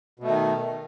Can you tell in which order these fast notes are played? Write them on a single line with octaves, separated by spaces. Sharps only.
B2 A3 D#3